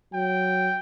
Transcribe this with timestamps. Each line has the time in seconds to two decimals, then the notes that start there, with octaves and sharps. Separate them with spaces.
0.13 F#3 G5